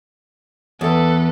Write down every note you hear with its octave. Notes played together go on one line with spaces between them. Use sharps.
E2 A4 B4